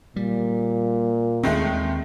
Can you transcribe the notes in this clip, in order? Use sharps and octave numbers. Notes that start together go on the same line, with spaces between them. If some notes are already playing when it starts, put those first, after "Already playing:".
A#2 G3
D#2 D#3 G#3 A3 C4